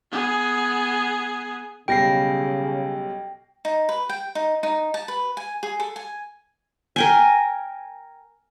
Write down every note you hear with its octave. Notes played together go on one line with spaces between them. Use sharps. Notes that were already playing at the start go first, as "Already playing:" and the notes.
B3 G#4
B1 C#3 G3 G5 A#6 C7
D#4
B4
G5
D#4
D#4
A5
B4
G#5
G#4
A4
G#5
A#4 G5 G#5